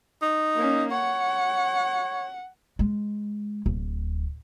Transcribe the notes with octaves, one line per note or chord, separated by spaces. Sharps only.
D#4
A#3 C#4
C#5 F#5
G#3
D1